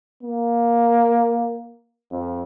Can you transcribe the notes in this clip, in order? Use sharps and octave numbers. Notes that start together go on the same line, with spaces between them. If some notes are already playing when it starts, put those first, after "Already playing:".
A#3
F2